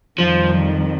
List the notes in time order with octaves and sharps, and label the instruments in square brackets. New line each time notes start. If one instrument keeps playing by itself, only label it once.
[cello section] F2 D#3 G3 [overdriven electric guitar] F3